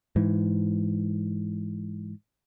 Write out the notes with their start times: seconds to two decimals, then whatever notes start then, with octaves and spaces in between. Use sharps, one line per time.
0.16 G#2 E3